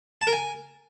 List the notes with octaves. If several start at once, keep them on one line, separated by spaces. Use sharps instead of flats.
A5
A#4
G#5